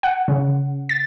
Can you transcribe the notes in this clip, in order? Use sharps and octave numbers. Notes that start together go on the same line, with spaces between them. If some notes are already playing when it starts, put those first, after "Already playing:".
F#5
C#3
A6